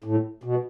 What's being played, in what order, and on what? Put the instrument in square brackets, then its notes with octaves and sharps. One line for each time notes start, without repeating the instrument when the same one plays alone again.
[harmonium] A2
B2